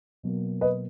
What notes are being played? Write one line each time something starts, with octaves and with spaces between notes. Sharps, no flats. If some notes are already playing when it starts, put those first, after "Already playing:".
B2 F#3 A#3
B4 D#5